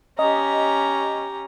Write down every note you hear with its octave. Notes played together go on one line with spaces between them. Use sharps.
C#4 G4 D#5 A#5